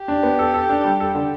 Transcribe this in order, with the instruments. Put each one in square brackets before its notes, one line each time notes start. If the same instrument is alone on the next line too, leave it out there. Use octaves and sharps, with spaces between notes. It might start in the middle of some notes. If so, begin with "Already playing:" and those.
Already playing: [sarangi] G4
[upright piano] D4
B3
A4
A4
D4
G3
A4
D3